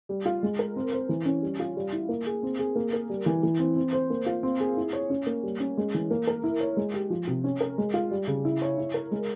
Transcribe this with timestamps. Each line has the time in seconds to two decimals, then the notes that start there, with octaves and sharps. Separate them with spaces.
0.09 G3
0.25 F4
0.43 G#3
0.59 A#4
0.76 C4
0.93 C5
1.09 E3
1.25 C#4
1.42 G3
1.59 F4
1.76 G3
1.93 E4
2.09 A#3
2.26 G#4
2.43 C4
2.59 G#4
2.76 A#3
2.93 A#4
3.10 G3
3.26 E3
3.43 E3
3.59 C4
3.76 C4
3.93 C5
4.10 A#3
4.26 F4
4.43 C4
4.60 G#4
4.77 E4
4.93 C#5
5.10 C#4
5.27 A#3
5.43 G3
5.60 C#4
5.78 G#3
5.94 E3
6.11 A#3
6.27 A#4
6.44 E4
6.60 C#5
6.77 G#3
6.94 G4
7.10 F3
7.27 C3
7.44 C#4
7.60 A#4
7.78 G#3
7.94 F4
8.11 G3
8.27 C#3
8.45 E4
8.62 C#5
8.78 E4
8.94 A#4
9.11 G#3